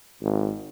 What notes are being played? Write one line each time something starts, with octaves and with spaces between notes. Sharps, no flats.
G#1